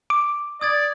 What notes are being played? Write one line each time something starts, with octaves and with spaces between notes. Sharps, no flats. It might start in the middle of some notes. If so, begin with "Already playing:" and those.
D6
D5 D#6 G#6 A6